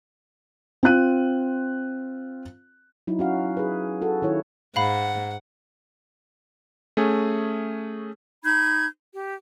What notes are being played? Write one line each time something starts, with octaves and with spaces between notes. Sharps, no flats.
C4 F4 F#6 D#7
F#3 D#4 E4
C#4 F#4 F5
G#4 B4
F#4 A4
D#3 E4 C#5
G#2 F5 F#5 B5
A3 C#4 G#4
D#4 B5 G6 G#6
G4